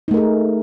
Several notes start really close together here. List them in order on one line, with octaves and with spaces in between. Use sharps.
D#4 A3 A#4 G#4